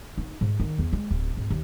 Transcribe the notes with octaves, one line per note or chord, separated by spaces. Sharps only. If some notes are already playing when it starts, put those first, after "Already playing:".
D#4
G#2
D#3
E2
G#3
D1
G#1
D#2